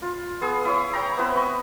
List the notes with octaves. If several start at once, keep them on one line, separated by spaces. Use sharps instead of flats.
F4
B3 G#4
E4 C#5 D#6
C#5 G5 A#5
B3 C4 E4 B4
D#5 C#6